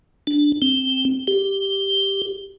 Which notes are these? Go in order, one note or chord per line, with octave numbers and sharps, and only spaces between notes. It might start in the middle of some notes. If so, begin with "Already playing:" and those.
D4
C4
G4